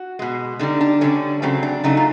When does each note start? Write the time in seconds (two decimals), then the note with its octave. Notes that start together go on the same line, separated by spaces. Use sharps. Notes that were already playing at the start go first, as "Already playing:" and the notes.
Already playing: F#4
0.19 B2 G#3
0.59 D3 G3 D#4
0.81 D4
1.01 D3 G3 C#4
1.42 C#3 F#3 A3 C4
1.63 D4
1.84 C#3 F#3 A3 D#4
1.97 F4